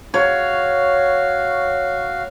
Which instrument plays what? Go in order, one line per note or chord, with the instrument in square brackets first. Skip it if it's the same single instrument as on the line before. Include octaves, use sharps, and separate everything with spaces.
[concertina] F#4 F5 [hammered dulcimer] C#5